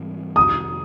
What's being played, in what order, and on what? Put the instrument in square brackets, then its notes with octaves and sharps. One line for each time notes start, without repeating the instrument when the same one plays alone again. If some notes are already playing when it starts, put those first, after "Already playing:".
Already playing: [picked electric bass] G#2 E3 G3 C4
[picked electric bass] F2 C3 D#3 [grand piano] D#6